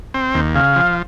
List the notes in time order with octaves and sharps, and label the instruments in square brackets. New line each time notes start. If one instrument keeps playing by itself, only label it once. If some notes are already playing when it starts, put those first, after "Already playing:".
[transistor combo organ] C4
D#2
[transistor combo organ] C#3 [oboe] F5
[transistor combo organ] F3